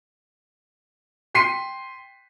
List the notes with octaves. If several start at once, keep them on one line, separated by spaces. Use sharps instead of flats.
G5 C6 B6 C7 D#7